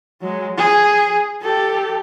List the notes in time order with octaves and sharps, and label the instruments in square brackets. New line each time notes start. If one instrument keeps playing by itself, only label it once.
[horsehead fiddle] F#3 G#3
G#4
G4 A4